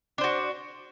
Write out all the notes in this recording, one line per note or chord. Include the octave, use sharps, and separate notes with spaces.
D4 F#4 C5